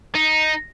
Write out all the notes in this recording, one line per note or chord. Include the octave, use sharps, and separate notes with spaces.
D#4